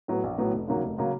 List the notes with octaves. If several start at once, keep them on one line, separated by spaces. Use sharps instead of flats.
A2 F#3 B3
A#1
A2 F#3 B3
F1
D#2 C#3 F#3 A#3
F1
C#3 F#3 A#3